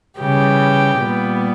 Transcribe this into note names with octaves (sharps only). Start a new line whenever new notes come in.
C#3 E3 G3 G4
A#2 G3 B3